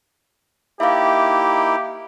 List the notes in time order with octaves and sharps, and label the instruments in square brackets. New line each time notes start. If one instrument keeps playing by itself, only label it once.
[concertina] A#3 D#4 E4 [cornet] G4 [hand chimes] E5 F5